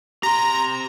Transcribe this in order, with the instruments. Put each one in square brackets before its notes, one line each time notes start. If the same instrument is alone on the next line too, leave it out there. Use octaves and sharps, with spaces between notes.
[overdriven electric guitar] G4 C6 [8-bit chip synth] A#5